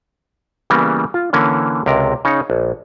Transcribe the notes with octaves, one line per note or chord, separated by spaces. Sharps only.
C#3 E3 G3 A#3 B3
F4
D3 E3 A#3 C#4
C#2 C3 A#4
C#3 D#4 C#5
A#1